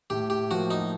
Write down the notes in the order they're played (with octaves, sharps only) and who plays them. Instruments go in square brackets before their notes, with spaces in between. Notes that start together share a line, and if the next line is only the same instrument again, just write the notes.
[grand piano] A2 [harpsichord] G4
[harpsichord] G4
[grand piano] F3 A#3 [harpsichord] F#4
[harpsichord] D#4